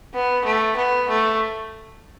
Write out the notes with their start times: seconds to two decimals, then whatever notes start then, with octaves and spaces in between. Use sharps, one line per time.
0.14 B3
0.44 A3
0.76 B3
1.08 A3